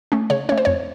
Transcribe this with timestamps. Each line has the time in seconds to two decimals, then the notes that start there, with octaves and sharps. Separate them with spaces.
0.12 A3 C#4
0.30 C#3 C#5
0.49 A3 C#4 C#5
0.58 C5
0.65 F2 C#5